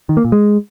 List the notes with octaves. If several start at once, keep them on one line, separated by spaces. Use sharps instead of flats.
D#3
A#3
A#2
G#3